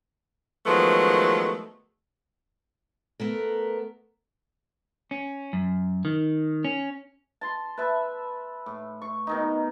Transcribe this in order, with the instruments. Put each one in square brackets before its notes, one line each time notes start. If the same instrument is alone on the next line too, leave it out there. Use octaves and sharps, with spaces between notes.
[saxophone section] D#3 F3 F#3 G#3 A3 B3
[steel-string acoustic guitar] A3 B3 A#4
[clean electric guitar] C#4
F#2
D#3
C#4
[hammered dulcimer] A5 C6
B4 E5 A5
A2
C#6
B2 D#3 D#4